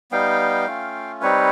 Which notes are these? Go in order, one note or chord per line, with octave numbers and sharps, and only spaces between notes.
G3 B3 D#4 F5 G5
A3 C#4 F4
G3 C4 D#4 B4 C#5